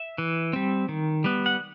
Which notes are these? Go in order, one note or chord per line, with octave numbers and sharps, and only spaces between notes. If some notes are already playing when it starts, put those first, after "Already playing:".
Already playing: E5
E3
G3 C4
D#3
G3 B3
F#5